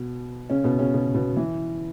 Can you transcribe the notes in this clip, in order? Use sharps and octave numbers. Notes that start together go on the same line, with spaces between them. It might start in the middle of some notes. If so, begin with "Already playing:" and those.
Already playing: B2 B3
C#3 C#4
B2 B3
C#3 C#4
B2 B3
B2 B3
E3